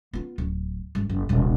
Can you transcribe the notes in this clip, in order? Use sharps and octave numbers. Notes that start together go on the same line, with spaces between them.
B3 F4
D1
G1
F#1
D#1 C2